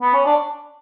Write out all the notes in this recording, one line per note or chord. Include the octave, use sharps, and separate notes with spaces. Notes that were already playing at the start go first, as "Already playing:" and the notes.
B3
C#4
D4